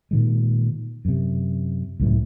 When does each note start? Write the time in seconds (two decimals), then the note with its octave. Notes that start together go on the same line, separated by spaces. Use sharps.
0.11 A#2 D#3 G#3
1.05 F#2 C3
2.00 C#2 F#2 A2